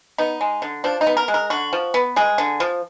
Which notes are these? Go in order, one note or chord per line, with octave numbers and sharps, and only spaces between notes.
B3 D#4
G#3
D3
F3 D4
D#4
B3
A#4
G#3
A#4
D3 F#4
F3
B3
G#3 G#4
D3
F3